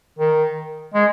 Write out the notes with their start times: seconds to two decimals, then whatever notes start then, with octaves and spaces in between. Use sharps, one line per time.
0.19 D#3
0.94 G#3